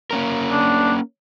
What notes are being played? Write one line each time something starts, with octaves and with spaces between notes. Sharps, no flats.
A#3 C#4 A#4
D4